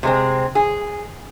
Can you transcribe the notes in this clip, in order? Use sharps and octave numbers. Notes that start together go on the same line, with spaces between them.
C3 G#3 C4
G#4